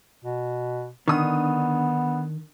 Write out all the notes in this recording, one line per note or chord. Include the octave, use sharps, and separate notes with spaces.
B2
D3 D#3 B3 D#6